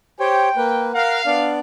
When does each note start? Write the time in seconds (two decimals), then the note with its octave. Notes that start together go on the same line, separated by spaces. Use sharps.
0.20 G4 C5 C#5 G5
0.57 A#3 B4
0.94 A#4 F5 F#5
1.26 B3 D4 D5